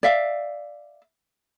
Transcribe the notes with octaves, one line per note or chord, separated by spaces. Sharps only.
D5 E5 F5